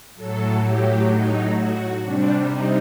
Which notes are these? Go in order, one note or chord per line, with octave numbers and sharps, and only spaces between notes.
A2 F#3 A4
G4
D#4
F#4
C3 G3 D4
D#4